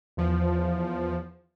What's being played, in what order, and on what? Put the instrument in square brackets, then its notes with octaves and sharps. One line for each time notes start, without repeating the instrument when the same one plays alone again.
[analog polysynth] E2 F3